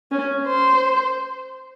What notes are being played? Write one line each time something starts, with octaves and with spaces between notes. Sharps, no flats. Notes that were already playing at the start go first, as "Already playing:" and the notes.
C#4
C5